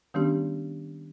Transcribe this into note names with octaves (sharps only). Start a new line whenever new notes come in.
D#3 G3 B3 C#4 D4 G4